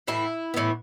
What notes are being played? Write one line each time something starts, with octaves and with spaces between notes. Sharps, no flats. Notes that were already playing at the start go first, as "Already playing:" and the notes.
A2 E3 B3 E4
A2 E3 B3